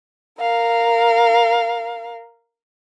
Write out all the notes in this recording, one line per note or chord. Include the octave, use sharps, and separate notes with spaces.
A#4 F5